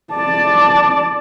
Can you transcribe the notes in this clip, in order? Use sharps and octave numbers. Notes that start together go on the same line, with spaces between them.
D5 A5